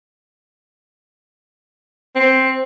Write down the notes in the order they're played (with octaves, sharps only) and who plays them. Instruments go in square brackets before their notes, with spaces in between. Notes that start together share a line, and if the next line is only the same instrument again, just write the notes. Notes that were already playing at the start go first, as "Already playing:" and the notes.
[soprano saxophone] C4